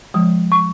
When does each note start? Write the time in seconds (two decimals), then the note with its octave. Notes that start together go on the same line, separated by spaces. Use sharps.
0.14 F3 G#3 D#6
0.52 C#6